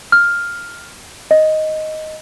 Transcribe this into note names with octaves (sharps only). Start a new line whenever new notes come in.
F6
D#5